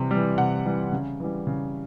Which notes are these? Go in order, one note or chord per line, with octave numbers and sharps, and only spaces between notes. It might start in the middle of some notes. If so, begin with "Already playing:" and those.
Already playing: C3 E3 G3
E3 G3
C3 F#5
E3 G3
C#3
E3 G3
C#3